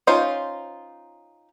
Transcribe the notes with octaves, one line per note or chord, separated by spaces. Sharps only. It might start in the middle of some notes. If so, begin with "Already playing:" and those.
C#4 D#4 F4 C5